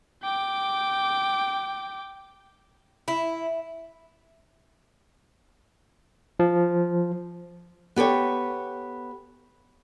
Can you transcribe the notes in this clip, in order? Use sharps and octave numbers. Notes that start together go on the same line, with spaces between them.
G5 D6
E4
F3
B3 G4 A4 C#5